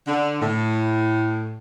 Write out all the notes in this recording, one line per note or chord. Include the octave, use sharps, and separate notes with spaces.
D3
A2